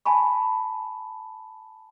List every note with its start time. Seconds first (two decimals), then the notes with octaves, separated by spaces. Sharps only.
0.06 G#5 A5 B5 C#6